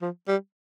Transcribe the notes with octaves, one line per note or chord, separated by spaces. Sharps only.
F3
G3